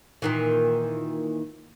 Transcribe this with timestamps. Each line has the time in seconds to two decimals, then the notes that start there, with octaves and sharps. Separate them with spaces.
0.22 A#2 D#3 E3